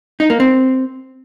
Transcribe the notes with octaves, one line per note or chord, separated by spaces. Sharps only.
D#4
A#3
C4